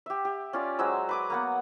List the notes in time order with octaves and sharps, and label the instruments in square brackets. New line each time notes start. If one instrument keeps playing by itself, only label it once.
[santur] G4 E5
G4
C#4 F4 D5
F#3 G#3 C5 E6
B4 D6 D#6
A#3 B3 F#5